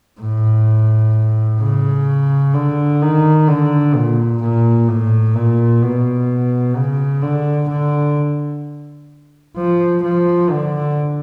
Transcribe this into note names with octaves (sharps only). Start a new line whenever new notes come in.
A2
C#3
D3
D#3
D3
A#2
A#2
A2
A#2
B2
C#3
D3
D3
F3
F3
D3